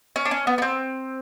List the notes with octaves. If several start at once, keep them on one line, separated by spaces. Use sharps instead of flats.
C#4
D4
C#4
B3
B3
C4